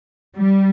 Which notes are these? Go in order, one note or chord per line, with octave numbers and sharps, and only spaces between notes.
G3